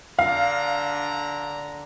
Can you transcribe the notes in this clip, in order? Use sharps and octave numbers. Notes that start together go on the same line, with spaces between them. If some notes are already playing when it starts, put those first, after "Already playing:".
D3 D4 F5 A#5